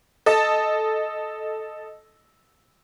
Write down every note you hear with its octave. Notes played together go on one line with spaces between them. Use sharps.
A4 D#5 A5